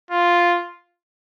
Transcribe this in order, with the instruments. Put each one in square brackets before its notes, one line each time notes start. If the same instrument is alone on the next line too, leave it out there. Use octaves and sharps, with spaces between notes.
[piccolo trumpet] F4